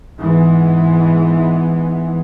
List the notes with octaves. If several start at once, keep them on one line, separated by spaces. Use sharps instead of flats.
G#2 E3 G#3 B3